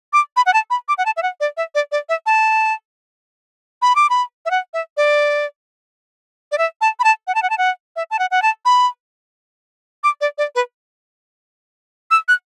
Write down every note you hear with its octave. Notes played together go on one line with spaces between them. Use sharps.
D6
B5
F#5
A5
B5
D6
F#5
A5
E5
F#5
D5
E5
D5
D5
E5
A5
B5
D6
B5
E5
F#5
E5
D5
D5
E5
A5
B5
A5
F#5
A5
F#5
A5
F#5
E5
A5
F#5
F#5
A5
B5
D6
D5
D5
B4
E6
F#6